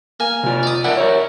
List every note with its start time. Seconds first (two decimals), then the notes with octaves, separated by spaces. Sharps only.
0.20 A#3 G#5
0.43 C3 F4
0.63 D5 D#6
0.84 E4 A#4 D5 F#5
0.97 A#4 C#5